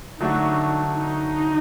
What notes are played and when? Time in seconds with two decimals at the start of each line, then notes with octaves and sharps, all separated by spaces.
0.20 D3 F#3 A3 D4 D#4 F#4
0.97 D#4